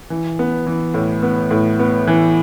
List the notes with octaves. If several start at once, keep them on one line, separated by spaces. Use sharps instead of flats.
E3
B3
E3
A2
B3
A2
B3
E3